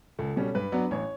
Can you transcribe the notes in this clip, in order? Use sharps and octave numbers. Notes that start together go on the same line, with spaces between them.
C#2 A4
B2 G3 C#4
G2 B4
F#3 B3 D4
A1 C#5